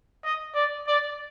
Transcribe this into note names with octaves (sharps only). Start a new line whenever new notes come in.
D#5
D5
D5